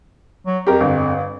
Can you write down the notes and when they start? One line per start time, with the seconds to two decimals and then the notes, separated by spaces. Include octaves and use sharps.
0.46 F#3
0.67 F2 G4 A#4
0.81 G1